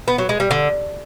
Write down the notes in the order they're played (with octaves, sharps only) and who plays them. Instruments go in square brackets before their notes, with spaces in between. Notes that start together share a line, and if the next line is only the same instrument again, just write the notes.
[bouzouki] B3
F#3
G#3
G3
D3